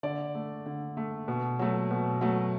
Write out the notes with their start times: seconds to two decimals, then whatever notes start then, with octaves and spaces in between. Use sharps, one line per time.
0.03 D3 D5
0.35 A3
0.66 D3
0.97 A3
1.28 B2
1.59 F#3 A3
1.91 B2
2.21 F#3 A3